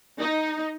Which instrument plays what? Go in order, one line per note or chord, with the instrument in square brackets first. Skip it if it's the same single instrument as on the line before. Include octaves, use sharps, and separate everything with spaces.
[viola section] D#4